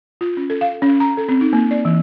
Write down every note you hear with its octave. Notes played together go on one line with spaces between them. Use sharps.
F4
C#4
A4
F5
C#4
A#5
A4
C4
D#4
A#3
D5
E3